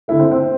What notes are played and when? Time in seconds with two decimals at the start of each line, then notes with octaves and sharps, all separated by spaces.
0.08 D3 A3 E4
0.20 C4
0.31 C4